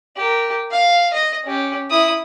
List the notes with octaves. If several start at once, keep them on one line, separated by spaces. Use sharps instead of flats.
G4 A#4
F5
D#5
C#4 G4
E4 D#6